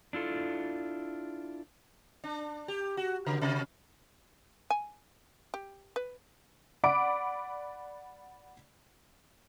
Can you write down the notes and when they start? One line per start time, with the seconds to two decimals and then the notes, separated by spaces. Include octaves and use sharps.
0.13 D4 E4 F4 A4
2.24 D4
2.68 G4
2.97 F#4
3.26 C#3
3.41 C3
4.70 G#5
5.54 G4
5.96 B4
6.84 D5 F#5 B5 D6 D7